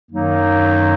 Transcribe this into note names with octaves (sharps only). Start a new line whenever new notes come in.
F#2 D#3 F#3 A#3 D#4